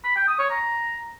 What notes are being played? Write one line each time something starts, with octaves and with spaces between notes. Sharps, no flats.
B5
G5
D#6
C#5
A#5